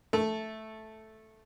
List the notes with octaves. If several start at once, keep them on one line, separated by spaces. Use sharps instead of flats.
A3